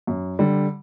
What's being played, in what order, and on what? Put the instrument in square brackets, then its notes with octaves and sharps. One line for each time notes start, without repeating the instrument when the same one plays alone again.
[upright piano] F#2
D3 G3